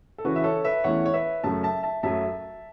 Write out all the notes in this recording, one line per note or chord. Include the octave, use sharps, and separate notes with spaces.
A4
C#3 E3 C#4 F#4 B4
E5
A4 C#5
B4 E5
E2 E3 A3 C#4 E4 C#5 F#5
C#5
B4 E5
F#2 C#3 F#3 A3 E5 A5
E5 A5
E5 A5
F#2 F#3 A3 E5 A5